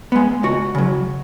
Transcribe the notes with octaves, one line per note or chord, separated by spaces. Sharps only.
G#3 B3
C#2 F#4
C#3 F#3